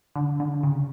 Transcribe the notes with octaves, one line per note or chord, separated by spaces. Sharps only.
D3
D3
C#3